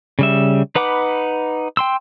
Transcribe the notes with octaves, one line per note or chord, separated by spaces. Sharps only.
C#3 G3 E5
D#4 B4 F#5 B5 D6
G5 C6 E6